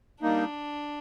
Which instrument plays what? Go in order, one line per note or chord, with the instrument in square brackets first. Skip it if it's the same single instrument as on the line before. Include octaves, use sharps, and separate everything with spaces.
[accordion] G3 A#3 D#4 [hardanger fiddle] D4